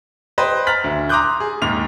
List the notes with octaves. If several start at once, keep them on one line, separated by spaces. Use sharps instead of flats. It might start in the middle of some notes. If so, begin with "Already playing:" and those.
B4 C5 D#5 G5
A#5 F6 A6 B6 F#7
D2
A#5 C6 D6 D#6 F#6 G6
G#4
D#2 G#2 F7